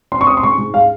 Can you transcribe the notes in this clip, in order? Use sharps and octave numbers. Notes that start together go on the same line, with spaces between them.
C4 C6
C#6
C4 D#6
C6
G#2 C#6
G#2
G#3 F5